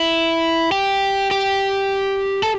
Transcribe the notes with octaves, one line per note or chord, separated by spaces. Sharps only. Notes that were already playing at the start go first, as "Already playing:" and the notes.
Already playing: E4
G4
G4
A4